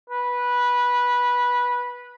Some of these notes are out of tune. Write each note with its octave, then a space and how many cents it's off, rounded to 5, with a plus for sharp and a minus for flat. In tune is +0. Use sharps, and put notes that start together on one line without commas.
B4 -15